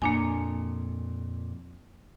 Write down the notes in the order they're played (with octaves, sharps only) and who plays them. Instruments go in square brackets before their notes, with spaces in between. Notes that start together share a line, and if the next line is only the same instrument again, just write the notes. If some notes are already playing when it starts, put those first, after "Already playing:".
[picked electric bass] F2 A#2 [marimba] A#3 D4 G#5